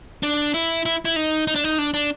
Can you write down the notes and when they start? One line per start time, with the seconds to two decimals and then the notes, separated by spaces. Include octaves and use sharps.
0.23 D4
0.54 E4
0.85 E4
1.05 E4
1.16 D#4
1.47 D#4
1.56 D4
1.64 D#4
1.79 D4
1.94 D4